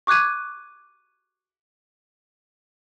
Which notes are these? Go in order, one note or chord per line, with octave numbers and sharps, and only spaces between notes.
C#6 D6 F#6 G#6 D#7